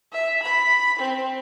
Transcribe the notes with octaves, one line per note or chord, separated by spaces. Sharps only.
E5
B5
C4